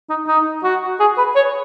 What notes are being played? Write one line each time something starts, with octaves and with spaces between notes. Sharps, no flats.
D#4
D#4
F#4
G#4
B4
C#5